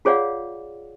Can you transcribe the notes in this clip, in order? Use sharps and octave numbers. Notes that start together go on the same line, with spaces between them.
F4 G#4 C#5 D5 F5 F#5